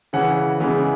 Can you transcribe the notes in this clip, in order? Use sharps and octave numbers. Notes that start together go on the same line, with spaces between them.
C#3 E3 C#4 F#5
C#3 E3 G#3 B3